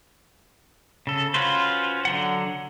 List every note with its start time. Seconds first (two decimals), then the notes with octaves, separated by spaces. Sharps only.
1.07 C#3 A4
1.34 C#4 F4 F#4 B4 C5
2.05 D3 F#3 F#5